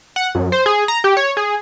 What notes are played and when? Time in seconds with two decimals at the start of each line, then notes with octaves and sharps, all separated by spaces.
0.16 F#5
0.35 F#2
0.52 C5
0.66 G#4
0.88 A#5
1.04 G4
1.17 C#5
1.37 G#4